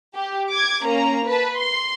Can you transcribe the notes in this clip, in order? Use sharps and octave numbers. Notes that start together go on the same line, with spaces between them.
G4
D6 G#6
A#3 C#4 A#5
B4 A5
C6